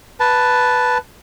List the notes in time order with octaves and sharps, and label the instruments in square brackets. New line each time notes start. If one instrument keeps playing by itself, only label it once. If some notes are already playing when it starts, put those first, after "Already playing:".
[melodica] B4 A5